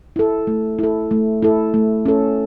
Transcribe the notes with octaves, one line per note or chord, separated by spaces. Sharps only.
E4 A4
A3
E4 A4
A3
E4 A4
A3
C#4 A4